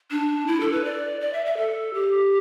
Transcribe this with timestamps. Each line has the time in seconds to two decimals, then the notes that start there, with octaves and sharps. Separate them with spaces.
0.11 D4
0.47 E4
0.60 A4
0.72 B4
0.84 D5
1.21 D5
1.33 E5
1.46 E5
1.57 A4
1.94 G4